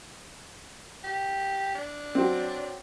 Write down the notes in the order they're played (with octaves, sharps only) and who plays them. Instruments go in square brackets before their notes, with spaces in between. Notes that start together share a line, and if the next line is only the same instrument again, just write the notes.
[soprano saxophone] G4
D4
[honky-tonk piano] F#3 C4